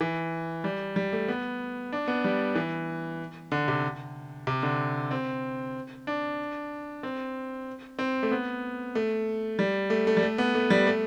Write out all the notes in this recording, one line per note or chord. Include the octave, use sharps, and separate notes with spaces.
E3
G3
G3
A3
B3
D4
B3
G3
E3
D3
C3
C3
D3
C4
D4
C4
C4
A3
B3
A3
G3
A3
A3
G3
A3
B3
A3
G3
A3